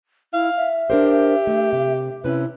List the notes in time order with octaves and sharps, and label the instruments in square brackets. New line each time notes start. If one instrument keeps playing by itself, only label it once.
[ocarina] E4 [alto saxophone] F5
[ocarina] E5
[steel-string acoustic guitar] D4 A#4 C5 [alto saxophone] G4
[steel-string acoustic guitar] A3
C3
[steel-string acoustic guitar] C3 C#4 [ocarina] E4 [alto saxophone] B4